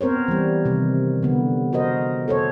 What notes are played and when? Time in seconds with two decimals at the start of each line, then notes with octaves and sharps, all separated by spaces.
0.01 B3 C4 A#4 C5 C#5
0.28 E3 G3
0.65 C3 D#3
1.23 D3 B3
1.73 F#4 A#4 C5 D#5
2.28 A4 C5 C#5